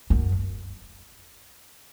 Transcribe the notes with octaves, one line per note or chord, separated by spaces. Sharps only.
F#2